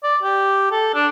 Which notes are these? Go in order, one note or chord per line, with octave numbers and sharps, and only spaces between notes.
D5
G4
A4
D4